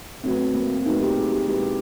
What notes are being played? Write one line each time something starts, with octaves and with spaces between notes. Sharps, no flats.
A2 F#3 B3 C4
C4
A#3
C4
A2 F#3 B3 D#4
G4
G#4
G4
B2 G#3 B3 E4 G4